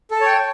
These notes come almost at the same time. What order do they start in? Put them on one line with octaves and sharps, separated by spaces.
A4 A5 C#5 G5